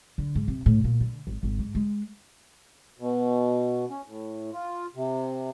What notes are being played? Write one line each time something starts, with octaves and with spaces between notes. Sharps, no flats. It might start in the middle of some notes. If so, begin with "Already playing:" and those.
D3
G#2
C3
A2
A#2
D3
G#1
G#1
G#2
G#3
B2
C#4
A2
F4
C3